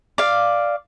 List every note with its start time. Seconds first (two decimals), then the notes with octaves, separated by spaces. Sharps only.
0.18 D5 F5